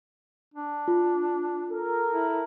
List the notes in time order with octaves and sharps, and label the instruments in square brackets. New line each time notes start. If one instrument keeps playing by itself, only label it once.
[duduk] D4
[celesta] F4
[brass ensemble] A4 A#4
[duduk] E4